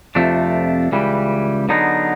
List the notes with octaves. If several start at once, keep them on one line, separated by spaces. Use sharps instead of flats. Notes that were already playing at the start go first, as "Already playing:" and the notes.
F2 C3 F3 A3 D4
C#2 C#3 E3 G3
D3 F#3 B3 D#4 G#4